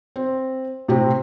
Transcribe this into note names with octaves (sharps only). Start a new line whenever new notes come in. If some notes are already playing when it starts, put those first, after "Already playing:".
C4
A2 C3 C4 G4